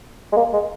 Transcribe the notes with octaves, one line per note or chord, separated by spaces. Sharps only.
G#3
A#3
G#3